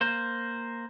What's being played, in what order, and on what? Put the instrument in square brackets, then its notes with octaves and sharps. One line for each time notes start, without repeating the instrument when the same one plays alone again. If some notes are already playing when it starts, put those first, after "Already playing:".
[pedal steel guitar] A#3 C5